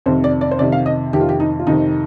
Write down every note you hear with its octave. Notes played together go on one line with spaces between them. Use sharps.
F2 C3 D#3 C5
D5
D5
C5
F2 C3 D#3 D5
F5
D#5
F2 C3 D#3 G4
F4
G4
D#4
F4
F2 C3 D#3 D#4